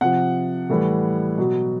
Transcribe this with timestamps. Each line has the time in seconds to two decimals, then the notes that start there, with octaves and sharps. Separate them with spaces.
0.01 C3 F3 F#5
0.70 A2 E3 G3
1.38 B2 F#3